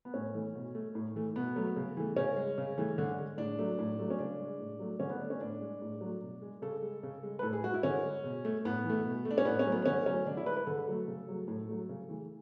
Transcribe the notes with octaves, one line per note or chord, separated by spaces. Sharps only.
B3
A2 C#4
E3 A3
B2
A3
A2
E3 A3
B2 B3
F#3 A3
C#3
E3 A3
C#3 C#4
G#3
C#3
E3 A3
D3
G#3
A2 D4
F#3 A3
A2
F#3 A3
C#4
C#3 D4
G#3
A2
F#3 A3
D3 C#4
B3
A3 D4
C#4
A2 D4
G#3
A2
F#3 A3
B2
G#3
C#3 A4
G#3
C#3
G#3
B4
A2 A4
G#4
G#3 F#4
E4
D3 C#4
G#3
B2
A3
A2 B3
E3
A3
B2
A3
D4
C#4
A2 B3
C#4
F#3 A3
B3
B3
D3 C#4
F#3 A3 C#4
D3 D4
E4
G#3 B4
B4
D3 A4
F#3 A3
C#3
F#3 A3
A2
F#3 A3
C#3
E3 A3